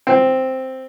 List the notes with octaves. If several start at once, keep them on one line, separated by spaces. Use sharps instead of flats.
C4